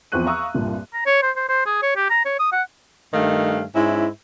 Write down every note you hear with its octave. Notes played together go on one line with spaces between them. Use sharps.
E2 F3 C4 C#6 F#6 D#7
E5 F5 A#5 C#6 D#6 E6
C2 G2 A#2
A#5
C#5
C5
C5
C5
G#4
C#5
G4
A#5
C#5
D#6
F#5
G2 D#3 A3 F5
G#2 C#4 E4